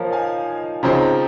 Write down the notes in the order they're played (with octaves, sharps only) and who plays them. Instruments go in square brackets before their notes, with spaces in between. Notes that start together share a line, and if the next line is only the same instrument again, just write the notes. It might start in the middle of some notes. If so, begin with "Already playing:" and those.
Already playing: [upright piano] F3 A#3 D#4 [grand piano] C5 C#5 D#5 F5
[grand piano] F5 G#5
[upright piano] C#3 F3 C4 D#4 [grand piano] G5 A#5
[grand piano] G5 A#5